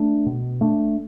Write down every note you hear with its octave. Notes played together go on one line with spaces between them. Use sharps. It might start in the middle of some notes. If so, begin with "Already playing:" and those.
Already playing: A3 D4
B2
A3 D4